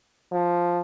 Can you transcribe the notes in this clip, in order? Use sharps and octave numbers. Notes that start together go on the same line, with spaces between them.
F3